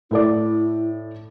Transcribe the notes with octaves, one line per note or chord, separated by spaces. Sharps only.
A2 E4 A4 D5